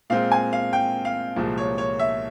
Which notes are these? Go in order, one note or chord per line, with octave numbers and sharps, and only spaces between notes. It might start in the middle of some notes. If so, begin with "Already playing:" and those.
A#2 G#3 C4 F5
G#5
F5
G5
F5
C2 A#2 F3 G#3
C#5
C#5
E5